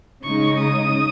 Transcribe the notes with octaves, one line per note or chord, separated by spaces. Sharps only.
C#3 G#3 D#4 C#6
D#6